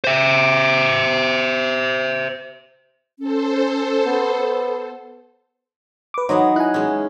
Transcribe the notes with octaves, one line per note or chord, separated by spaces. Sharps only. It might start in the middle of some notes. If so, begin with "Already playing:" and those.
C5 E5
C#4 A4 C5
B3
B4 D6
F#3 B3 D#4 C5 C#5
E4 G#5 F#6
G#3 C#4